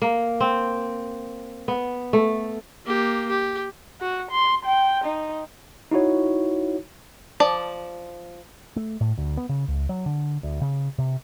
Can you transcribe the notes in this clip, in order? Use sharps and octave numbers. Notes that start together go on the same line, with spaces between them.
A#3
C4
B3
A3
A#3 G4
G4
F#4
C6
G5
D#4
D#4 E4 F#4 C#5
F3 D5 A5
A3
A2
D2
B3
C#3
C#2
F#3
D3
D2
C#3
C3